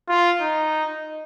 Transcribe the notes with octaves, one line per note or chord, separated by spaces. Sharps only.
F4
D#4